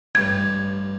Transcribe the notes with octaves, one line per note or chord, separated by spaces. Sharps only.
A1 G2 G#6